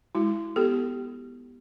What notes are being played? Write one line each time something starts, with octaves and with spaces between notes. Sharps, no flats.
G#3 E4 F#4
B3 G4 A4